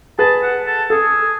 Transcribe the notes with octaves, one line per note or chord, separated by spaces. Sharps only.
G#4 B4 A5
F#5
A4
G#4 A4